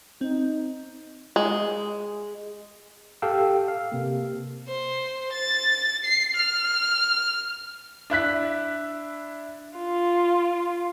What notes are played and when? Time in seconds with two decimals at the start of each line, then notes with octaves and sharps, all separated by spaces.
0.21 C4 D#4
1.36 G#3
3.22 G4 A4 F5 G5 E6
3.68 F5
3.92 C3 A#3
4.68 C5
5.32 A6
6.04 C7
6.36 F6
8.10 D4 E4 F#6 B6
9.78 F4